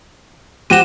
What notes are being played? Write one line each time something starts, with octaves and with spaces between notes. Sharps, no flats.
F#4 G4 C5 D#7 E7